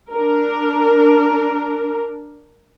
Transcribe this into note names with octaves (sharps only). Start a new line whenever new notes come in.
D4 A#4